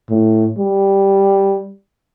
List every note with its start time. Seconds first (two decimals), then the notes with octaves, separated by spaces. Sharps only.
0.11 A2
0.59 G3